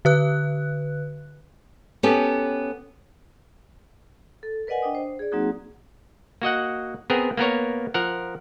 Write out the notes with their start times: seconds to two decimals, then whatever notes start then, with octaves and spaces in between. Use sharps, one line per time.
0.05 D3 B4 F#6
2.03 B3 C#4 G4 A4
4.43 A4
4.67 A#4 B4 D5 D#5 F#5 G#5
4.82 D4 D#5 G5 D#6
4.95 C5
5.19 G#4 D5
5.32 F#3 A#3 C4 D#4 F#4 G#4
6.42 A#3 F#4 D#5 F#5
7.10 B3 C4 G#4 A#4
7.37 A#3 B3 A#4 C#5
7.94 F3 A#4 F#5